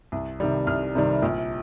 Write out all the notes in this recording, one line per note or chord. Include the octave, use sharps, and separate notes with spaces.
C2
C3 D#3 G3
C2 F6
C3 D#3 G3
A#1